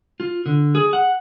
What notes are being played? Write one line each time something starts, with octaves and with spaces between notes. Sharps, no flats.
F4
D3
G#4
F#5